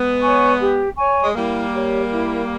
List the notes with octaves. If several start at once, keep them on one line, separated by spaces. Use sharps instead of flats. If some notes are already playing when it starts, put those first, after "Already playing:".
Already playing: G#3 B3
C#5 G#5 C#6
G4
C#5 G#5 C#6
G#3
G3 A#3 E4
G4 C#5
E4